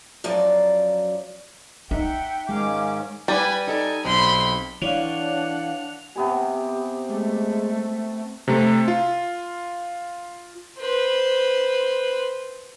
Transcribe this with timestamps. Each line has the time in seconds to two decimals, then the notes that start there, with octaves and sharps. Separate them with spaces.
0.24 F#2 F3 F#3 D5
1.91 D#4 E5 F#5 G5
2.49 G#2 D#3 G#3 C#4 F5 D6
3.28 G3 B4 G#5
3.67 D#4 A4 D5 G#5
4.05 B1 C4 B5 C6
4.82 E3 D4 C#5 D5 F5 F#5 F7
6.16 C3 B3 G4 G#5
7.09 G#3 A3
8.48 C3 A3
8.88 F4
10.79 B4 C5